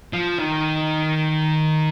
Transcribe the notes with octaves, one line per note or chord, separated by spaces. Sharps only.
F3
D#3